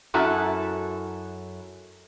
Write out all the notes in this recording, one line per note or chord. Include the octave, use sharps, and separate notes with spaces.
F#2 E4 F#4 A4